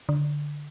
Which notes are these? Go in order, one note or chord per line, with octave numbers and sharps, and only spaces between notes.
D3